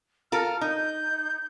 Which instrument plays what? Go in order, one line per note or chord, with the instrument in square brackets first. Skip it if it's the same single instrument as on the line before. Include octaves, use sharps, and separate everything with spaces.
[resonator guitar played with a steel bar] F4 A4 A#4 [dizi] F6
[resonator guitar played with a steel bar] D#4 [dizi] G6